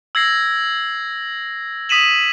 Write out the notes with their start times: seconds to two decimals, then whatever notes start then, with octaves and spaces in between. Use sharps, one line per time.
0.15 E6 G#6 A#6 C7
1.89 D#6 B6 D#7 E7 F#7